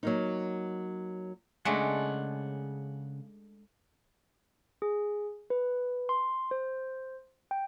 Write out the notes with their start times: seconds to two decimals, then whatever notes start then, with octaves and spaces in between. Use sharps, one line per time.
0.03 F#3 A#3 D#4
1.65 C#3 G#3 A3 D4 F#5
4.82 G#4
5.50 B4
6.09 C6
6.51 C5
7.51 G5